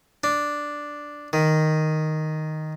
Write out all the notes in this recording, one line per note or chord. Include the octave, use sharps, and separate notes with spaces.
D4
D#3